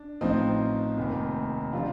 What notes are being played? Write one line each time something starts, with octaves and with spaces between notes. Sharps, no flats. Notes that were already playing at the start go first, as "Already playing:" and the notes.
Already playing: D4
A1 A2 F3 C4 D#4
F1 D#2 D#3
C3 F3 D4 F4